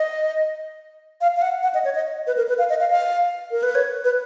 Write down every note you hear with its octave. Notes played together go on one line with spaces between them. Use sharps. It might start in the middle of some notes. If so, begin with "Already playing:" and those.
Already playing: D#5
F5
F5
F#5
F#5
D#5
C#5
D#5
B4
A#4
B4
F5
D#5
F5
F5
A#4
B4
C#5
B4